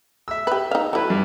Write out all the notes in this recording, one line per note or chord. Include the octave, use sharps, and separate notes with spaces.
E5 E6
G4 B4
D#4 F5
F#3 E4 A4 B4
G2